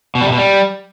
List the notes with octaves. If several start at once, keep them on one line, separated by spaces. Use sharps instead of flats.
B2
G3
C3
B2
G3